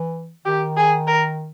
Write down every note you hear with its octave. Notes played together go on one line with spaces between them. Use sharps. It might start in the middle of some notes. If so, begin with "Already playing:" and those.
Already playing: E3
D#3 G4
G#4
A#4